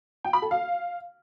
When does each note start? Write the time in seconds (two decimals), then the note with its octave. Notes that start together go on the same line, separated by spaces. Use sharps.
0.24 G5
0.33 B5
0.42 A4
0.51 F5